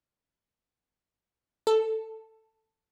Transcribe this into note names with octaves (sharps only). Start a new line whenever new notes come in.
A4